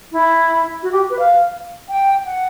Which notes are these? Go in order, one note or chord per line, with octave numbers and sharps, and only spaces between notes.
E4
F#4
G4
B4
F5
G5
F#5